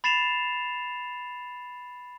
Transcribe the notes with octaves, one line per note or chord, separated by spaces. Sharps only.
B5 A6 C7 E7 F7